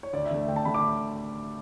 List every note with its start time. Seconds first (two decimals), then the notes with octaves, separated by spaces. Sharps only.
0.03 C#5
0.13 D2 D5
0.25 E5
0.31 D3 A3
0.48 D2 G5
0.56 A5
0.65 D3 A3 B5
0.74 D6